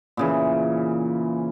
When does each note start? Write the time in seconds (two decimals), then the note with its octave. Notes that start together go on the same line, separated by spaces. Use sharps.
0.17 A#2 C#3 E3